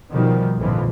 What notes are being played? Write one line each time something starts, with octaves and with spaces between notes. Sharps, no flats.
B2 D#3 F3 G3
A#1 F2 G#2 D3 E3 F3